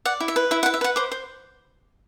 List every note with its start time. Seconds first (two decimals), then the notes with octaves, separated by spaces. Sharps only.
0.05 D5 F#5
0.20 E4
0.28 E5
0.36 B4
0.51 E4 E5
0.63 F#5
0.66 B4
0.74 E5
0.81 B4 F#5
0.96 C5 D6
1.12 C5